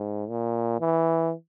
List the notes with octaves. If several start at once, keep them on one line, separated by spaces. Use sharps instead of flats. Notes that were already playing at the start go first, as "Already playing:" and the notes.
Already playing: G#2
A#2
E3